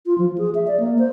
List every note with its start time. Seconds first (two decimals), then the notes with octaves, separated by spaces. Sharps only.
0.06 F4
0.18 F3
0.38 G#4
0.55 E5
0.67 D5
0.80 A#3
0.99 C5